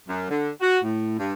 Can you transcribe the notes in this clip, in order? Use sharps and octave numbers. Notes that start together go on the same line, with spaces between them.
F#2
D3
F#4
A2
G2